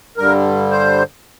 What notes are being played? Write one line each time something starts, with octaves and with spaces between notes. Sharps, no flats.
G2 D3 G3 A#4
C5